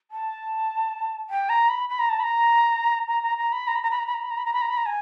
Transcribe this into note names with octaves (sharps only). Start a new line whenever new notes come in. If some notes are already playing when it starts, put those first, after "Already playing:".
A5
G5
A#5
B5
B5
A#5
A5
B5
A#5
A#5
A#5
A#5
B5
A#5
B5
A#5
B5
A#5
B5
A#5
B5
A#5
B5
A#5
B5
A#5
B5
A#5
G#5